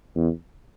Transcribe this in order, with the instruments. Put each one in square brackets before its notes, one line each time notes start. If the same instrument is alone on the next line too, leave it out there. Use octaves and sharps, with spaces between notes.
[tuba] E2